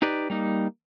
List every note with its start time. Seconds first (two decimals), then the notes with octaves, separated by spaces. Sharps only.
0.02 D#4 G4 B4 D5
0.30 G3 A#3 D#4